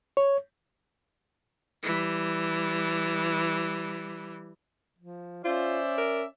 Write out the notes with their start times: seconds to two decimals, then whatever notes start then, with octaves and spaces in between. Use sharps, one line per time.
0.17 C#5
1.83 E3 G3
4.99 F3
5.44 C#4 F4 C5 D5 E5
5.98 A#4